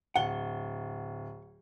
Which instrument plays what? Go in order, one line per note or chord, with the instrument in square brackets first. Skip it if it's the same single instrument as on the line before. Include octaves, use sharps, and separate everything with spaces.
[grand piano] D1 G7 [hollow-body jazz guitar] F#5